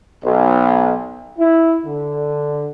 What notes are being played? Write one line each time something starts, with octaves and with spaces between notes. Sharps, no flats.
B1
E4
D3